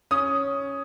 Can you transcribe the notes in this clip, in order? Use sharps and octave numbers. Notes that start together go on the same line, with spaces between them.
C#4 D#6